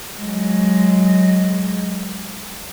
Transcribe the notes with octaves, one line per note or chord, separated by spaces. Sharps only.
F#3 G#3